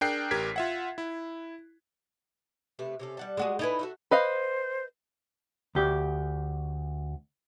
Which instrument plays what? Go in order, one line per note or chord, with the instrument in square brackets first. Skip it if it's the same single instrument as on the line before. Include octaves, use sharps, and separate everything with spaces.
[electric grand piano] D4 G#4 A#4 G5 F#6 C7
A1 G4 A#4 G#6 B6
F4 E5 F#5
E4
[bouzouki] C3 A3 B4
C3 C#4 A4
G3 F#5 A5
[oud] G#3 F#4 G#4
[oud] D#4 E4 B4 [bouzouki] A4 G#5
[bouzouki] F#4 A4 E5
[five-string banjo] B4 D#5 F5 [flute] C5
[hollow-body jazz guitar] D2 G4